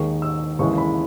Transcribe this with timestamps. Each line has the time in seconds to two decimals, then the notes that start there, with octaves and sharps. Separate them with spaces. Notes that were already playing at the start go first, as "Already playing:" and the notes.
Already playing: D#2 D#3 G#3 C#6
0.22 E6
0.59 D#2 C#3 E3 G#3 C#6
0.78 B5